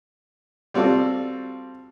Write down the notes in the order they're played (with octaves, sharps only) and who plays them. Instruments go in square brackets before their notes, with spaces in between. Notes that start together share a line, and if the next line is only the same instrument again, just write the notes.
[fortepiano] G3 C4 F4 F#4 A4 D5